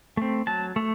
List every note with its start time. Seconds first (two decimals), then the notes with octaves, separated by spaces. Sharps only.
0.17 A3 C4
0.47 F#3 A5
0.76 A3